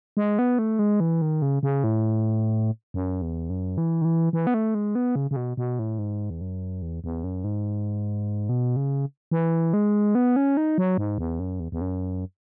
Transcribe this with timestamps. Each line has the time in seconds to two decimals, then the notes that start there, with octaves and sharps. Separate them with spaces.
0.17 G#3
0.39 B3
0.59 A3
0.79 G#3
1.00 E3
1.22 D#3
1.42 C#3
1.63 C#3
1.84 A2
2.94 F#2
3.22 E2
3.50 F#2
3.78 E3
4.02 D#3
4.05 E3
4.33 E3
4.47 B3
4.54 A3
4.75 G#3
4.95 B3
5.16 C#3
5.31 C#3
5.36 B2
5.57 B2
5.79 A2
5.99 G#2
6.30 E2
6.41 F#2
6.82 E2
7.04 E2
7.24 F#2
7.44 G#2
8.49 B2
8.76 C#3
9.31 E3
9.73 G#3
10.15 B3
10.36 C#4
10.57 D#4
10.78 F#3
10.98 G#2
11.18 E2
11.40 F#2
11.60 E2
11.72 E2
11.81 F#2